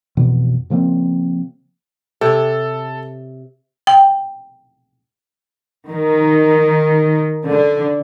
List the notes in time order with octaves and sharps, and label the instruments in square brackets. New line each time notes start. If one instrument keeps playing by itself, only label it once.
[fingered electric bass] F2 B2 E3
C#3 F3 A#3 C4
[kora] C3 C#5 [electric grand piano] A4
[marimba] G5
[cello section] D#3
D3